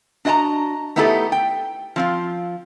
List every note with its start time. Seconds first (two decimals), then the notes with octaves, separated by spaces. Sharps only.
0.25 D4 F#4 D#5 F#5 A5 A#5
0.96 A3 B3 D#4 E4 G4 A4
1.32 G5
1.96 F3 C4 F4